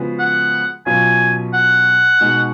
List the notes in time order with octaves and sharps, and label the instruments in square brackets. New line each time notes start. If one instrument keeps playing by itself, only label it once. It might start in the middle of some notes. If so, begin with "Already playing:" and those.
Already playing: [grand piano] C#3 F3 G#3 B3 F#4
[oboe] F#5
[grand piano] B2 F#3 C#4 F4 [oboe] G#5
[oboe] F#5
[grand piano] B2 G#3 D#4 F#4